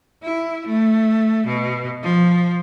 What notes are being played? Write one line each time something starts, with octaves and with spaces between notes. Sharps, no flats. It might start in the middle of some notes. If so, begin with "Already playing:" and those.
E4
A3
B2
F3